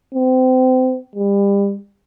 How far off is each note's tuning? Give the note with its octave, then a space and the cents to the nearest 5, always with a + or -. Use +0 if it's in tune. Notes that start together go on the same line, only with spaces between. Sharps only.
C4 -30
G3 +35